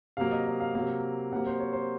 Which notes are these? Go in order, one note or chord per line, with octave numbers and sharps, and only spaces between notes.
C3 F#3 A#3 F5
D#5
D#5
F5
C3 F#3 A#3 F5
C3 F#3 A#3 F#5
C5
C#5
C5